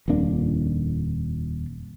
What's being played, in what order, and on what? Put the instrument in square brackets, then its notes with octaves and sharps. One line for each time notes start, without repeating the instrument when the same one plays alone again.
[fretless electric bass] D#1 F2 A#3 D4